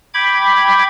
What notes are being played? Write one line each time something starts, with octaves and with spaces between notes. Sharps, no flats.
G5 B5 D6 G#6